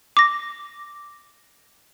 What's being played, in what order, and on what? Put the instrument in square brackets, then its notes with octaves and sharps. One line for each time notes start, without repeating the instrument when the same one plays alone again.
[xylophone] D6 A#6